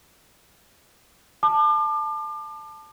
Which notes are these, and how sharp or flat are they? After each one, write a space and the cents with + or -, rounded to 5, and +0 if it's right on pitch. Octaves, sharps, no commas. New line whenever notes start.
A5 +0 D6 +35